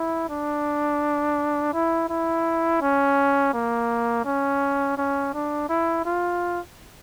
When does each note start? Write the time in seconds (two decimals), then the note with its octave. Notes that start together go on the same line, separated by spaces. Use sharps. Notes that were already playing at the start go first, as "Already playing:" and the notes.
Already playing: E4
0.29 D4
1.73 E4
2.09 E4
2.81 C#4
3.54 A#3
4.25 C#4
4.98 C#4
5.34 D4
5.69 E4
6.05 F4